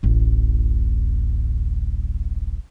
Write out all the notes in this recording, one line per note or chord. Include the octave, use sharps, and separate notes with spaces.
D1 A1